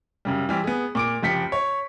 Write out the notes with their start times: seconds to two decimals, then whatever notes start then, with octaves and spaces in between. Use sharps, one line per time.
0.25 F#2 C#3 G3
0.49 E3 G3 C4
0.64 B3 G#4
0.95 A#2 D6 D7
1.23 F#1 F3 G4 B6 C#7
1.52 C#5